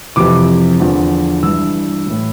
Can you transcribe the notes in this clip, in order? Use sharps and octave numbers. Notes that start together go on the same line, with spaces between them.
F2 C3 E3 D6
E2 D3 F3
G2 E3 E6
A2 E3